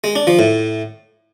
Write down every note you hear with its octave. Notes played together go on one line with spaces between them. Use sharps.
G#3
D4
F3
A2